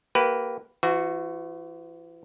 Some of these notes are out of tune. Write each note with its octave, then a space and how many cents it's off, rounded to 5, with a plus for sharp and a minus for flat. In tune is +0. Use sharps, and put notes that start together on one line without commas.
A#3 +0 G4 -25 B4 +0
E3 +40 F#4 -10